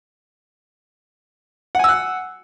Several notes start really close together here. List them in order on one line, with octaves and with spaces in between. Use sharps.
F#5 G#5 E6 F#6